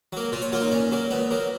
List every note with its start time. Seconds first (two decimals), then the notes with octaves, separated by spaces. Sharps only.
0.13 F#3 A#3
0.32 A#2 F4
0.42 C#5
0.52 F#3 A#3 F4
0.62 D#4
0.71 A#2 C#4
0.92 F#3 A#3
1.10 A#2 B3
1.31 F#3 A#3